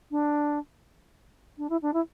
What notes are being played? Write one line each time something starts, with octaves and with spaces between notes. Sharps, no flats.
D4
D4
E4
D4
E4